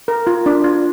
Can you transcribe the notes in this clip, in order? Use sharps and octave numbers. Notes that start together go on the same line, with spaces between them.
A#4
F4
D4
F4